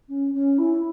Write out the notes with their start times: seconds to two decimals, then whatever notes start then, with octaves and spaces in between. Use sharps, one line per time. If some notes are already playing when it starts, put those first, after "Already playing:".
0.08 C#4
0.33 C#4
0.58 E4